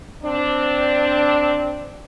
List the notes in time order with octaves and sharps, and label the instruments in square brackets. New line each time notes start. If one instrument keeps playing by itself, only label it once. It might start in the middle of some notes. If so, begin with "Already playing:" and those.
[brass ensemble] C4 D4